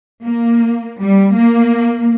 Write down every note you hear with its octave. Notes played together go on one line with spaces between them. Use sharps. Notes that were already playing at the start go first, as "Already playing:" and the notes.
A#3
G3
A#3